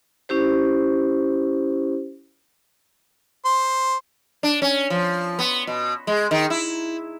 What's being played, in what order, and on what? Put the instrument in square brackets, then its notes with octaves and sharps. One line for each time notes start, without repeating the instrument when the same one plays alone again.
[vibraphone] C#4 E4 G4 C5
[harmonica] C5
[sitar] D4
C#4
F3
B3
B2
G#3
D#3
E4